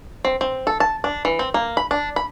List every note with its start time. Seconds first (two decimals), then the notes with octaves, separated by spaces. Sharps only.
0.25 C4
0.41 C4
0.67 A4
0.80 A5
1.04 D4
1.25 E3
1.39 C4
1.54 A#3
1.77 B5
1.91 D4
2.16 B5